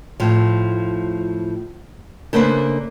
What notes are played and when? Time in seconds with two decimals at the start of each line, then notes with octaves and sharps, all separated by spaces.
0.20 A2 F3
2.33 C#3 A3 A#3 D4 B4 C5